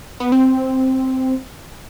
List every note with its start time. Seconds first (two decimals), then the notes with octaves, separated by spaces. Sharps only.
0.20 B3
0.32 C4